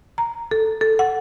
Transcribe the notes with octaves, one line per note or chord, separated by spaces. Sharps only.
A#5
A4
A4
F#5